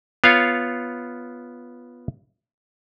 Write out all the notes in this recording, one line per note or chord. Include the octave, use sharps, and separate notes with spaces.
B3 F4 C#5 F5